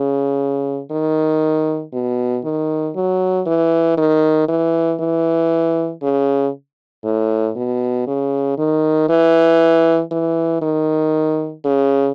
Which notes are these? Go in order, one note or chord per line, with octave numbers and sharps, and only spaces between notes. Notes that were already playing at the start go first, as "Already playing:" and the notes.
Already playing: C#3
D#3
B2
D#3
F#3
E3
D#3
E3
E3
C#3
A2
B2
C#3
D#3
E3
E3
D#3
C#3